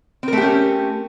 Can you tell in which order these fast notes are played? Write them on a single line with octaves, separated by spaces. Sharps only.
C4 A#4 A3 G4 C#4